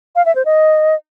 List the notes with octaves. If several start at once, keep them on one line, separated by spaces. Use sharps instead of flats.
F5
E5
C5
D#5